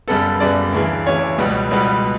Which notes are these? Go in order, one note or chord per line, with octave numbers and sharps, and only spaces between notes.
F#2 C#3 G3 B3 A4
F#2 C#3 G3 B3 D5
D2 C#3 E3
D2 C#3 E3 C#5
C#2 B2 G3 B3
C#2 B2 G3 B3 B4